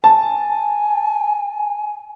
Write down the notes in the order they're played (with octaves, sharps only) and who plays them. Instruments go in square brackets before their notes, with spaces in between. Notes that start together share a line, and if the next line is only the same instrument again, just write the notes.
[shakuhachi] G#5 [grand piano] A5